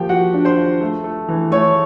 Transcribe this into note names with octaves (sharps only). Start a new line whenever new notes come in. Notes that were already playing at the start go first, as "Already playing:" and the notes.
Already playing: F3 A#3 G4 G5
F4 F#4 F#5
D4
C5 C6
F4
A3
A3
E3
A3 C#5 C#6